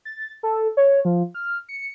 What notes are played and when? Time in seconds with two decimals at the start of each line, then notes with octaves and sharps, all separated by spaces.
0.05 A6
0.43 A4
0.77 C#5
1.05 F3
1.34 F6
1.69 C#7